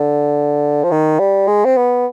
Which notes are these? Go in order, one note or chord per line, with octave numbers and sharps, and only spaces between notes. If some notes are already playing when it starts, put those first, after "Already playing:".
Already playing: D3
F3
D#3
G3
G#3
C4
B3